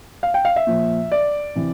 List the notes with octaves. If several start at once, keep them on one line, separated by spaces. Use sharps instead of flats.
F5
G5
F5
E5
A#2 F3
D5
C3 E3